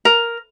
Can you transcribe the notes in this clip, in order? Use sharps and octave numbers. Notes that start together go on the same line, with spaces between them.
A#4